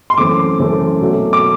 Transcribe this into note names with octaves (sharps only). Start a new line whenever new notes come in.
C6
F#2 E3 A3 C4 D6
F#2 E3 A3 C4
B2 F#3 A3
D6